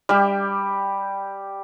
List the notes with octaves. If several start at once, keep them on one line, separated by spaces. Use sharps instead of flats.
G3 G4